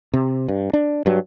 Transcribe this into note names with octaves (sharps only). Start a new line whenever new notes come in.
C3
G2
D4
G2 F#3